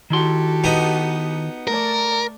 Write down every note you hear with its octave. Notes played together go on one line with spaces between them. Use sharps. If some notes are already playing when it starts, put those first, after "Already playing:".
D#3 E4 F#4 G4 A4 C6
B3 D#4
A3 A4 A#4 D5